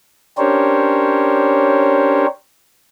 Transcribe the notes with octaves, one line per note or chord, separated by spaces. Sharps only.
C#4 D4 G4 A#4 C5 C#5